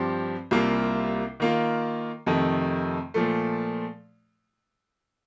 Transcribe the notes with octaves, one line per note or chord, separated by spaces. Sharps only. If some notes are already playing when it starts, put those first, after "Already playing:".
Already playing: G2 F3 C4 G4
C2 C3 G3 A#3 F4
D#3 A#3 F4
F2 C3 D#3 A3
A#2 F3 A3